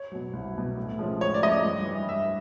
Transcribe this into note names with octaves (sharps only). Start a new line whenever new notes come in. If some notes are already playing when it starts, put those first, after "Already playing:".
Already playing: C#5
B2 F#3
C2
B2 F#3
A2
F3 G#3 C#4
A2 C#5
D5
F3 G#3 C#4 D#5
G2
E3 G3
G2 E5